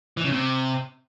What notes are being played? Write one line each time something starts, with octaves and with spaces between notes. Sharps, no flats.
E3
C#3
C3